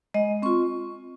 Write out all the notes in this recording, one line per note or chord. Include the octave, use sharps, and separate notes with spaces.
G#3 D#5
C4 F4 C#6